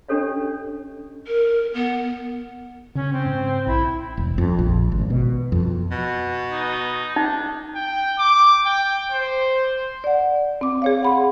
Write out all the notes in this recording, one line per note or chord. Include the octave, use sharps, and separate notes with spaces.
C#4 D4 G4 A4 C#5 D#5
A#4
B3
C#3 C#4
C4
G#2
A#1 E4
E1
F2
A#1
G#1
B2
F2
B2
D#4
D4 D#4
G5
D6
G5
C5
D5 F#5
C4 D6
G#4 C#5 F5
F#5 B5 C6